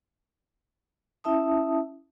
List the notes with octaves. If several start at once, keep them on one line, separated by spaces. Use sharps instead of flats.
C#4 E4 E5 A5 D#6